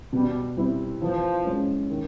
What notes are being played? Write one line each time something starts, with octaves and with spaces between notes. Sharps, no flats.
B2 G3
G3 C4 E4
E3 F3
G#3 C#4
D#3